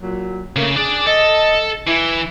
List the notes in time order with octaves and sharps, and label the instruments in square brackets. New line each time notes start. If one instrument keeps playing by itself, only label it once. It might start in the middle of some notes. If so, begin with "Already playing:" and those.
[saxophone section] A#2 F#3
[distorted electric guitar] C#3 [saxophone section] A3 A#3
[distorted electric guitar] D4 D5 [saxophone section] G#4
[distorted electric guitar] A4 [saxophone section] D#5
[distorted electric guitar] E3 [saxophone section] E4